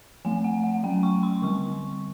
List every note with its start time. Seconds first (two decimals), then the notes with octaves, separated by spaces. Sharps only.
0.25 F3 A3 C4 G#5
0.44 F#5
0.64 F#5
0.83 F#3 A3 C#4 G5
1.03 C#6
1.23 C6
1.42 D3 G3 C4 C#6